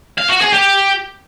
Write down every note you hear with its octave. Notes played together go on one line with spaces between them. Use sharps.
F5
F#4
G#4
G4